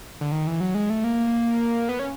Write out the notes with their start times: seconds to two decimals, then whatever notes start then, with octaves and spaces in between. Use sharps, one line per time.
0.21 D3
0.32 D#3
0.47 E3
0.61 F#3
0.75 G#3
0.90 A3
1.04 A#3
1.89 B3
1.99 C#4